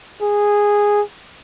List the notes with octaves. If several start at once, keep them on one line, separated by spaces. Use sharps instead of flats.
G#4